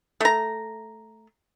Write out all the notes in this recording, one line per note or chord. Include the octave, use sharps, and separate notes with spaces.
A3 A#5